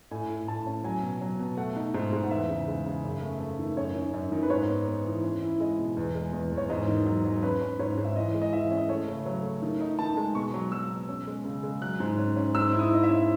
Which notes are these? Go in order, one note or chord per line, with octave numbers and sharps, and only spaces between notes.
A2 G#5
A2
A2 A5
C#4
F#3 G#5
B2
F#3
B2
A3 F#5
D#4
G#2
G#2
F#5
E2 E5
C#3
G#3
C#3
F#2
A3
A3
D#3
F#2 C#5
D#3
F#2
D#3
B4
G#2 C#5
B3
B3
E3
C#4
E4
G#3 D#5
B2
E2
G#3
E2
E2
C#5
G#2 D#5
D#3
F#3
F#3
C#4 B4
C#4
G#2 C#5
G#2
E5
E3 D#5
G#3
D#5
E3 E5
C#4
D#5
A3 C#5
C#3
F#3 C#5
A3
D#3
D#4
D#3 A5
G#3
B2 C#6
F#3
F#3 E6
B2
C#4
G#3
C#3
G#3
F#3 F#6
G#2
C#4
C#4
G#2 E6
E4
D#6
E4 D#5
E5
C#4